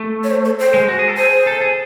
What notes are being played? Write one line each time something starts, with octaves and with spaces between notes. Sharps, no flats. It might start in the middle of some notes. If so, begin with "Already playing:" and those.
Already playing: A3
C#5
C5
A4
C5
G#3
F#4
G#4
A4
G#4 C5
A4
G#4